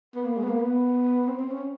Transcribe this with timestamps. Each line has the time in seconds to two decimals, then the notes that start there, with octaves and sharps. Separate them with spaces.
0.15 B3
0.25 A#3
0.37 G#3
0.44 B3
0.49 A#3
0.60 B3
1.28 C4
1.39 C4
1.51 C#4